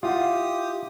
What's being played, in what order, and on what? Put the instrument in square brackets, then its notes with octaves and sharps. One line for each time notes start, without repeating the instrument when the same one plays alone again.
[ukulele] E4 F5 F#5 [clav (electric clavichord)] F4 [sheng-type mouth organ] G4 D#6